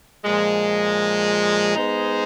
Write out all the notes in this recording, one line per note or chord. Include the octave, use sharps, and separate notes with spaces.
A#2 F3 G#3
G#3 B3 D#4 G#4 C5